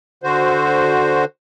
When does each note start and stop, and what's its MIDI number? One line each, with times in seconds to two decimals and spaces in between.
0.23 1.25 50
0.23 1.25 66
0.23 1.25 72